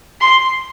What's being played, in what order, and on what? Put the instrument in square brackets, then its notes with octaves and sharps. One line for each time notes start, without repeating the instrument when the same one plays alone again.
[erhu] C6